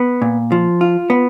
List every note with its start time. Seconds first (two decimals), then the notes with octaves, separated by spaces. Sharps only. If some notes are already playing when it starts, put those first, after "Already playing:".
Already playing: B3
0.22 A#2
0.52 F3
0.81 F4
1.10 B3